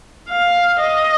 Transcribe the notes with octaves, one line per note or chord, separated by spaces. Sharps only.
F5
D#5